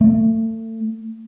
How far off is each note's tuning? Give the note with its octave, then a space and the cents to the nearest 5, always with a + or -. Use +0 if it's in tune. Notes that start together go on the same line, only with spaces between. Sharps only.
A3 +30